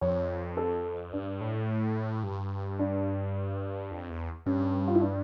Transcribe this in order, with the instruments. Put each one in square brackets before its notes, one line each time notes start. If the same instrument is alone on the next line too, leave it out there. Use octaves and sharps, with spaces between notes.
[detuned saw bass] F2 [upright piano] C#5
[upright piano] A4
[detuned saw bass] G2 [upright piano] D4
[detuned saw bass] A2
G2
[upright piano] D4
[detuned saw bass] F2
E2
[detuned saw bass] G2 [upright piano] C#4
[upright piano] F4
E4
D4